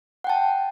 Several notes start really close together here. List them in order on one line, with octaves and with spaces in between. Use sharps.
F#5 G5 A5